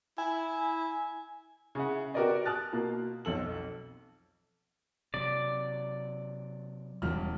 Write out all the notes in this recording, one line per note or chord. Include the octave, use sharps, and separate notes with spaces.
E4 G#5
C#3 C#4 E4 F#5
F#4 G4 A#4 B4 D5 D#5
A5 D#6 F6 F#6 A6
B2 A#3 F4
B1 F2 A4 F#7
C3 F#3 D5
E1 C#3 F#3 G3 F6